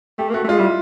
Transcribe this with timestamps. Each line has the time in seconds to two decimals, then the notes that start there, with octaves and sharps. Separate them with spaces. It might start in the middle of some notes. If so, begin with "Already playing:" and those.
0.18 A3 G4
0.29 A#3
0.34 A3 F#4
0.44 A3
0.49 G#3 F4
0.59 G3 E4